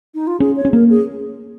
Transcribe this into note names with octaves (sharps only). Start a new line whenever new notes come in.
D#4
F4
C#4 G#4
C#5
C#4
A#3 A#4
G#4